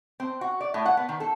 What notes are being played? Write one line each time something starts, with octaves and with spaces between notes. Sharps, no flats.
C4
F#4
D5
A2
F#5
B3
D#3
A4